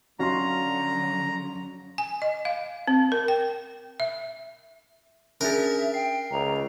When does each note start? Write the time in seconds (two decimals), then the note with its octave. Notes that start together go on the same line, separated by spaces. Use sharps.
0.19 D3 F#3 C#4 F#4 F5 A#5 C6
1.98 G#5
2.22 D#5
2.45 F5
2.87 C4
3.12 A#4
3.28 G5
4.00 E5
5.41 C#4 D4 G#4 A#4 E5
5.94 G5 C7
6.31 C#2 A#5